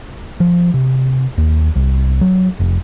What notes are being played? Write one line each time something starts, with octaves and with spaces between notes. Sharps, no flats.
F3
C3
D#2
C2
F#3
F1